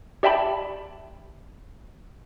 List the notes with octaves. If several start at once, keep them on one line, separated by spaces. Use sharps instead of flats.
G4 D5 E5 G5 A5 B5